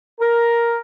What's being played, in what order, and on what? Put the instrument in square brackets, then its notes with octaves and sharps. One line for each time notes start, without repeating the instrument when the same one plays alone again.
[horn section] A#4